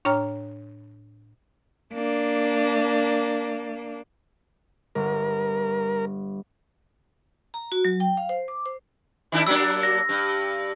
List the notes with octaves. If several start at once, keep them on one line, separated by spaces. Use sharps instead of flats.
A2 D4 C#5 G5 A#5 F6
A#3 D4
G1 A#4
A#5
F#4
F#3
G5
F5
C5
D6
C5
D#3 D4 E4
F#3 A#3 D4 E6
A#6
G2